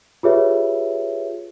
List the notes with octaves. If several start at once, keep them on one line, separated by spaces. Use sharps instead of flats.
F4 G4 G#4 B4 C#5 E5